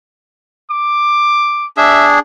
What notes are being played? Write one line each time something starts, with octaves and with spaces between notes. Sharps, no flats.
D6
D4 G#4 E5